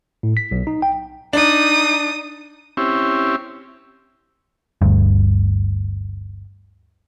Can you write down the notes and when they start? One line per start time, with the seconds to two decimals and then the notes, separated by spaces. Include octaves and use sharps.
0.23 A2
0.37 B6
0.51 B1
0.67 D#4
0.82 G5
1.33 D4 D#4 D#6
2.77 C4 C#4 E4 G4
4.82 G1 D2 G2